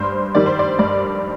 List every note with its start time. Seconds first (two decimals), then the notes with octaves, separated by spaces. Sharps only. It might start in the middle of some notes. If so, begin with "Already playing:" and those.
Already playing: G2 C5
0.35 D#3 G3 D5
0.46 C5
0.59 D5
0.79 G2 D5